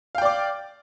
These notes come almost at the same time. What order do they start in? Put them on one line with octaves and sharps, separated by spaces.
F5 G5 D5 D6